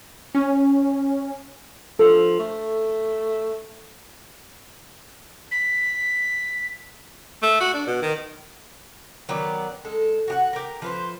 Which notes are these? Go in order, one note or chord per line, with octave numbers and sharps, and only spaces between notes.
C#4
F3 A4
A3
B6
A3
F#4
D4
B2
D#3
D#3 F#3 B3 D5
G#3 A4
F#4 G4 F#5
G4 A#4
F3 B4 C5